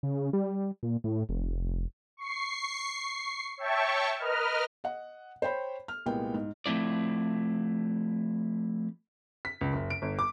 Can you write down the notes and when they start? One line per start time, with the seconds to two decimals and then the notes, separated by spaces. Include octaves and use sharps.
0.03 C#3
0.33 G3
0.83 A#2
1.04 A2
1.29 F1
2.17 C#6 C7
3.57 C#5 E5 G5 A5 C#6
4.18 A#4 B4 D#5 F6
4.84 D#5 F#5
5.42 C5 C#5 G5 B5
5.88 F6
6.06 C2 A#2 G#3 B3 G5
6.34 G#2
6.66 F3 A3 C4 E4 D5
9.45 B6
9.61 C#2
9.73 F#1
9.90 D7
10.02 G1
10.19 D6